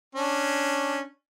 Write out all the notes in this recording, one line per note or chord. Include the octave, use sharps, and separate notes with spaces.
C#4 D4